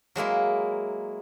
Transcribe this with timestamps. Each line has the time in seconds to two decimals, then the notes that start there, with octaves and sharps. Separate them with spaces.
0.15 F#3 G#3 A#3 E4